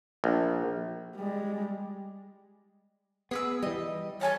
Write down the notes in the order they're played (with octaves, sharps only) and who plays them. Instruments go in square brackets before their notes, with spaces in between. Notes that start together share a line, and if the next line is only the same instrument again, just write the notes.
[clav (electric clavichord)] A#1
[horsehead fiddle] G3 G#3
[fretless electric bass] B3 [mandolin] G#4 B4 E6
[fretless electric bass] E3 G3 [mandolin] D#5
[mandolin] A4 G#5 A5 [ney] C#5